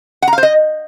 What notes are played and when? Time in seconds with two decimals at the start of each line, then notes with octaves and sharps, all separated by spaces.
0.22 F#5
0.28 A#5
0.33 F5
0.38 C5
0.43 D#5